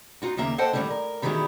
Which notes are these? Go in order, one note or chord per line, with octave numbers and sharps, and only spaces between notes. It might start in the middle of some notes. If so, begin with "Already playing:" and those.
D#4 F4 F#4
D#2 C#3 A#3 E5 A#5
A4 C5 D#5 F#5 G5 A5
A2 D#3 E3 G3 A3 E4
A#4
B2 D#3 E3 G3 G#3 E4